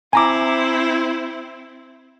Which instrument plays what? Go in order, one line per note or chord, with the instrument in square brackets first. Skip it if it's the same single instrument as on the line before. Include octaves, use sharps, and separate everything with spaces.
[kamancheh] C4 E4 [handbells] G#5 A#5 D6